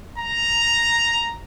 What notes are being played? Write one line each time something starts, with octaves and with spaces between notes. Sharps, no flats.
A#5